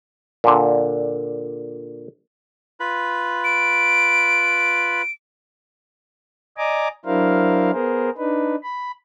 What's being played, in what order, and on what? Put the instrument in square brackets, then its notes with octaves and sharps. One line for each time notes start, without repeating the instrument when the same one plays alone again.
[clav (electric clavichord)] A#2 D3
[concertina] F4 B4 B5
[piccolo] D7
[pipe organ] D5 D#5 G#5 A#5 D6
F#3 D4 E4 A#4 C5 F5
B3 G#4 A#4 C5
D4 D#4 B4
B5